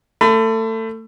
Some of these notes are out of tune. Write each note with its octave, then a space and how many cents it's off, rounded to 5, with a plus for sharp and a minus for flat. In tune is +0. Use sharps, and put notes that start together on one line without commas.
A3 +25 B5 +40